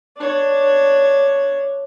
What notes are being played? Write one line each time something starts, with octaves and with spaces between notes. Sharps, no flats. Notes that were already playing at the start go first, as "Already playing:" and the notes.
D4 C#5